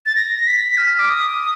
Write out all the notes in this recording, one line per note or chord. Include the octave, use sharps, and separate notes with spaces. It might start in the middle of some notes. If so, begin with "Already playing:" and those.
A6
A#6
B6
F6
D6
D#6